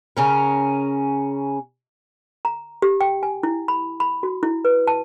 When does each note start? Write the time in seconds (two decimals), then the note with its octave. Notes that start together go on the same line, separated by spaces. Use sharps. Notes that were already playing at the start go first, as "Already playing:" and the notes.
0.17 C#3 C#4 A#4
2.45 A#5
2.82 G4
3.01 G5
3.23 G#5
3.43 E4
3.68 B5
4.00 B5
4.23 F#4
4.43 E4
4.65 B4
4.87 A5